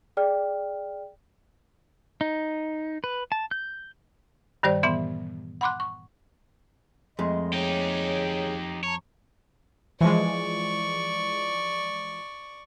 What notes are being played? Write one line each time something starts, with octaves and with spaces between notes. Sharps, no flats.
G#4 D5 G5 F6
D#4
B4
A5
G6
G2 D#3 G3 G4 C5 D5
A#2 E3 B3 E5 C6
F#5 B5 C6 D6 F#6
C#6
F2 G#3 A3 D#5 C6
D#4 G4 G#4 C#5 G5
C#5 A5 A#5
E3 F3 G#3 D5 C#6